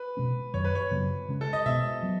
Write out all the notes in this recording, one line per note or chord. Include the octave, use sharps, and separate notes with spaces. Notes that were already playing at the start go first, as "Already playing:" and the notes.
Already playing: B4
B2 G#3 C#4
F#2 D#3 F#3 C#5
B4
C#5
F#2 C#3 F#3 B3
C#3 G#3 C#4
A4
D#5
B2 G#3 B3 E5
F#3 B3